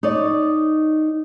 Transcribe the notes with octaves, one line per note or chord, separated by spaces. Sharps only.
D#4 C#5 D5